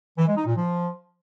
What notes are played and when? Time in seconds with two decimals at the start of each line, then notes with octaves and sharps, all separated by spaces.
0.18 E3
0.27 G#3
0.37 D#4
0.46 A#2
0.56 F3